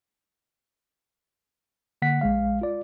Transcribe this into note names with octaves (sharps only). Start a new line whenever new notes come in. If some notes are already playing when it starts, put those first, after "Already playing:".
D3 A#3 F#5 B6
A#1 G#3 F5
F4 D5